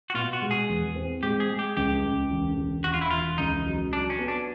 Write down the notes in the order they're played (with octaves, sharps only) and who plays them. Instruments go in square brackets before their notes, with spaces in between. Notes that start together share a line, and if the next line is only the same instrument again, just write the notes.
[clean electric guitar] F#4
[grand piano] B2 [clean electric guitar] F4
[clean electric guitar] F#4
[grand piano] G#3
[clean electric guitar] G#4
[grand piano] E2
C4
[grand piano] G#3 [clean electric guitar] G4
[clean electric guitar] G#4
[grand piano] G#3
[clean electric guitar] G4
[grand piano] C#2 [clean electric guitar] G4
[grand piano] C#2
E1
E1
[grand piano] E1 [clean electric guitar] F#4
[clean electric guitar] F4
E4
[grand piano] E1 [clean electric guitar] F4
[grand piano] C#2 [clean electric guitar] D#4
[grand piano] F#3
[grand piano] F#3 [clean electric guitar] D4
[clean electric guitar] C#4
[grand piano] B3
[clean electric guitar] D4